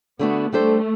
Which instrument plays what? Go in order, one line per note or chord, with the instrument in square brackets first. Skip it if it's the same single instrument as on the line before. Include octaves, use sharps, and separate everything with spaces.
[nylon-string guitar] D3 A3 D4 F#4 [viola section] B3
[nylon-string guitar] G3 D4 A4 C5 [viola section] A3